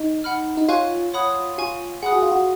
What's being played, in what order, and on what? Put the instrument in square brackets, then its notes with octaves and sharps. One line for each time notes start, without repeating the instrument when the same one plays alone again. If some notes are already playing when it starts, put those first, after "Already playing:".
Already playing: [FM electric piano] D#4
[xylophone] F#5 B5 F6
[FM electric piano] D#4
[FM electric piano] F4 [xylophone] C#5 F5 G#5 C#6 F#6
[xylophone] C#5 F#5 B5 D#6 F#6
[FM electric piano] F4 [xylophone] F5 G#5 C#6
[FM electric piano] G#4 [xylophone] F#5 B5 D#6 F#6
[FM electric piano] F#4
F4
F#4